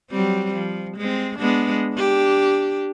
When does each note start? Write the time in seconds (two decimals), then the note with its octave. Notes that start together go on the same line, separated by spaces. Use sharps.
0.11 F#3 G3 C4
0.54 F3
0.97 G#3 C4
1.38 G#3 B3 D4
1.95 D4 G4